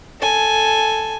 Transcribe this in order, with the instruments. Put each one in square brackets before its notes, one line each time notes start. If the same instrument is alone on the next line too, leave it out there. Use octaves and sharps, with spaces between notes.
[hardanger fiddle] A4 G#5